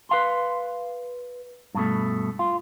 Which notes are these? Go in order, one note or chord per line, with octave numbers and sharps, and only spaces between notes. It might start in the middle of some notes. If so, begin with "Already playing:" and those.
B4 F5 C6
G2 B2 A3
F4